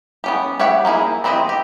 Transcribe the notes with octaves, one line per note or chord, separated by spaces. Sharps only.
B3 C#4 G4
G4 C#5 E5 F#5
A#3 D#4 E4 G#4
E3 C4 E4 G4 D#5
G4